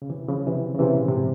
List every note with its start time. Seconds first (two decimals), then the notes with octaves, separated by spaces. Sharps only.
0.02 C#3
0.10 C3 E3
0.28 C#3 F3
0.47 C3 E3
0.75 C#3
0.79 C3 E3
0.94 A#2 C#3
1.08 G#2 C3